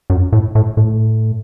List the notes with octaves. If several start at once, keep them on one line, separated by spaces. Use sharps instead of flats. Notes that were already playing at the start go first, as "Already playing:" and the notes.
F#2
A2
A2
A2